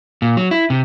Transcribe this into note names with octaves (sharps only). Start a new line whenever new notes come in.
A#2
F#3
E4
C3